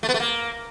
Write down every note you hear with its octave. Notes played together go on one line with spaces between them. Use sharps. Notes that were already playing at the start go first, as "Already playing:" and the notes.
A3
B3
A3
A#3